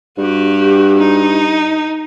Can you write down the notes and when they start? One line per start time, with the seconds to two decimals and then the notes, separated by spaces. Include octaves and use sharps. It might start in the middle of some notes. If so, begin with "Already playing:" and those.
0.18 G2 F#4 G4
0.99 D#4